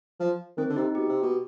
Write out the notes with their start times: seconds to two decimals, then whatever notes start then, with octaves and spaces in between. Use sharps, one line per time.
0.20 F3
0.57 D#3 C4
0.69 D3
0.76 C3 D#4
0.95 B2 G4
1.09 C3
1.23 B2